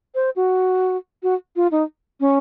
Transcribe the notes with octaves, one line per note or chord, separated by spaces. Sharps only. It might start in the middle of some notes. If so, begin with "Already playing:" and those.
C5
F#4
F#4
F4
D#4
C#4